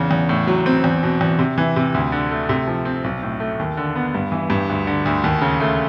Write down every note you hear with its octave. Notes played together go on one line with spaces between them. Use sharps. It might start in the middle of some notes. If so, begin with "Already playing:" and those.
Already playing: E2 C#3
E2
A2
F#3
C4
E2
B2
E2
C3
E3
C3
D2
D3
A3
C3
F3
C4
B1
A2
A3
D#2
D3
B3
G2
E3
G2
D2
D3
D2
D#2
C#3
A3